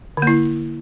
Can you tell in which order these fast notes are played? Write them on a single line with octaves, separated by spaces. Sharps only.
D3 A#3 E4